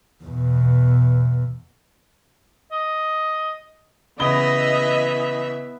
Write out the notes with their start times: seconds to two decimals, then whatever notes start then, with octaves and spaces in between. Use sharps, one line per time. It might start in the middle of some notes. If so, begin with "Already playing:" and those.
0.24 E2 B2
2.71 D#5
4.20 C#3 E3 B3 D#5 E5 G7